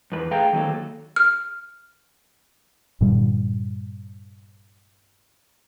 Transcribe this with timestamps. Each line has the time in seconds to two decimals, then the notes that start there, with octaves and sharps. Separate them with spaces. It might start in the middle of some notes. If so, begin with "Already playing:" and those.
0.12 E2 B4
0.31 A3 G#4 F5 G5 A#5
0.53 D#3 F#3 A#3 A4
1.16 F6
3.01 G2 A#2 D3 G3